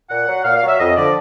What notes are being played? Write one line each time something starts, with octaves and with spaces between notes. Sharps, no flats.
A#2 F#5
F#3
A#2 F5
F5
F#3
E5
F2 D#5
D3 F3 D5